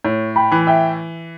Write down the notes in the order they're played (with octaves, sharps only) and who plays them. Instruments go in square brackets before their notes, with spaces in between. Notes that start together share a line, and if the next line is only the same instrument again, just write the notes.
[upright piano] A2 [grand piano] C#5
[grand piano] G5 B5
[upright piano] E3
[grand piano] E5 G5